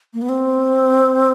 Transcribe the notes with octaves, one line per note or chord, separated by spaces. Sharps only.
A#3
B3
C4